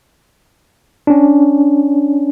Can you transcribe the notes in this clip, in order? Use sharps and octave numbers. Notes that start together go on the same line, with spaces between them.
C#4 D4